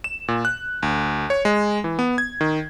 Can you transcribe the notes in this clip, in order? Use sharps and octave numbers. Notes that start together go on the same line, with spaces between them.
E7
A#2
F#6
D2
C#5
G#3
E3
B3
G#6
D#3